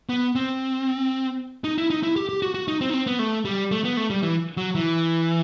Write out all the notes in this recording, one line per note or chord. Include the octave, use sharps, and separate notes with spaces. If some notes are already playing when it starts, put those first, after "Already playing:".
B3
C4
D#4
E4
D#4
E4
G4
G4
F#4
F#4
D#4
C4
D#4
C4
B3
A3
G3
A3
B3
A3
G3
E3
F#3
E3